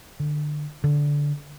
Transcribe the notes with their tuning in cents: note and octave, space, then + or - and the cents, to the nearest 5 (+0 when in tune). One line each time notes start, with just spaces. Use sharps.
D3 +25
D3 -10